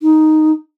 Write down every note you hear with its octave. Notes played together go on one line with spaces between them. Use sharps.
D#4